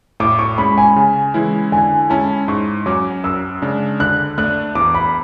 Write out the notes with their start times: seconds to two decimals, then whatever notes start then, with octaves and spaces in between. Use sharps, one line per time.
0.20 A2 D6
0.39 C#6
0.58 G#3 C#4 B5
0.78 G#5
0.96 C#3
1.34 E3 G#3 C#4 E4
1.72 D3 G#5
2.10 G#3 C#4 E4 A5
2.48 G#2 C#6
2.86 F#3 C#4 D6
3.24 F#2 E6
3.62 C#3 G#3 D4
4.00 D3 F#6
4.38 A3 D4 F#6
4.75 E2 D6
4.95 B5